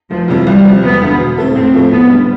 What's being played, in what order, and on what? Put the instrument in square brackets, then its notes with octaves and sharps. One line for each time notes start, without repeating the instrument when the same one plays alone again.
[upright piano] F1 [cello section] F3
[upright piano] F2 C3 E3 G3
[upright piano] C2 [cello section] G3
[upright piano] C3 F3
[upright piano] E1 [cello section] B3
[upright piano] E2 D3
B2
A3 C4 E4 A4
[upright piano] A2 [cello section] C4
[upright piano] F3 A3 E4
[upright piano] F1 [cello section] B3
[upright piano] D3 G3